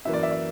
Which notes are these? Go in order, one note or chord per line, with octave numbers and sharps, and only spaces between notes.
F#2 E3 A#3 E5
D5
E5
D5